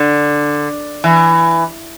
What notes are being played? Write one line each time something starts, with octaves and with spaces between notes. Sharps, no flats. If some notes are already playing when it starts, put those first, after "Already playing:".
Already playing: D3
E3